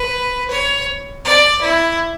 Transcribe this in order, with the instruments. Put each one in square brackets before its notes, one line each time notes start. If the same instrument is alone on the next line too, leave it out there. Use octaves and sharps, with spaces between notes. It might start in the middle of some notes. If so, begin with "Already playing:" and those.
Already playing: [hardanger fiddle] B4
C#5
D5
E4